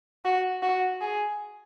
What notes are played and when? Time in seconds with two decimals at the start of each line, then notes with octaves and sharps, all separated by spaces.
0.25 F#4
0.62 F#4
1.01 G#4